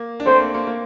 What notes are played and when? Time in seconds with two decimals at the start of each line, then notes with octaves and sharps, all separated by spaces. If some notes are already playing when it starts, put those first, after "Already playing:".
Already playing: A#3
0.20 D4
0.26 A3 C4 C5
0.40 A#3
0.54 A#3
0.67 A#3